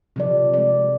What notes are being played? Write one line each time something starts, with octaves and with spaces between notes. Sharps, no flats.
C3 F3 D5
G#3 D5